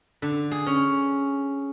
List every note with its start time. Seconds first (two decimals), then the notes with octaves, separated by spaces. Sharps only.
0.22 D3
0.51 G#4
0.66 C#4